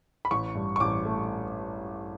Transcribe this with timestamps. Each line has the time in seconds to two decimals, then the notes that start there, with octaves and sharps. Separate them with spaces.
0.25 B5
0.31 A1 C#6
0.55 G2
0.76 C#6
0.80 A1 D6
1.05 A3